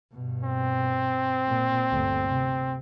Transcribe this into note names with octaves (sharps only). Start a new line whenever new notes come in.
G2 B2
C4
A#2
G1 D2
C3